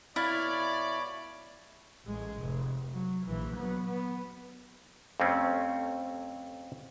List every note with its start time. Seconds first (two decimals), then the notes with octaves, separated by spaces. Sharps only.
0.16 B2 E4 C#5 D5 F5 B5 F6 A6
2.06 A1 G#3
2.38 F1
2.93 F#3
3.26 A#1 E3
3.56 F#3 B3
3.87 B3
5.20 F2 G3 A3 C4 C#4